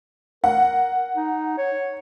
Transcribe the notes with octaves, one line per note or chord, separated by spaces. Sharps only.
A#4 F#5
D#4
C#5